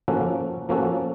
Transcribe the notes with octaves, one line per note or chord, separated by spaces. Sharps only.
F3 A#3 C#4 F#4 A4
F3 A#3 C#4 F#4 A4